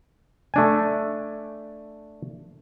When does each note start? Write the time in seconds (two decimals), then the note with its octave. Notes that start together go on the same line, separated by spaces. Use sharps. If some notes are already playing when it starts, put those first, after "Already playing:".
0.54 A3 D4 G#5